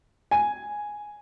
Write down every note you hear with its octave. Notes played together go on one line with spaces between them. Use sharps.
G#5